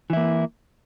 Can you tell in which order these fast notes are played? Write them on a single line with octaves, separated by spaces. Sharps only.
E3 E4 A#3